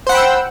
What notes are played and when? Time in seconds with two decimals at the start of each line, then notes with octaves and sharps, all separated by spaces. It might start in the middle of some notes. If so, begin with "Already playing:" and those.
0.07 C5
0.09 F#5
0.12 B5
0.14 G5
0.17 E6